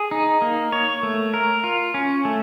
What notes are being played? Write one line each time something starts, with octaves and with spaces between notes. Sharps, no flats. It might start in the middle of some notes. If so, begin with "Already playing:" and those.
Already playing: G#4
D#4
A#3
C#5
A3
A#4
F4
C#4
A3